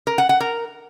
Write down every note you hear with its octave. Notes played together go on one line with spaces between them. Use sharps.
A#4
F#5
F#5
A#4